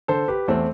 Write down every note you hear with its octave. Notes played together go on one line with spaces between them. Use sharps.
D3 A4 C5
G4 B4
E2 A3 C4